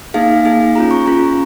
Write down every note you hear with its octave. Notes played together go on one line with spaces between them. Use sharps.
A#3 D#4 G#4 F5
A#3 D#4 G#4
C#4 F4 G#4 A#5
C#6
C#4 F4 G#4 A#5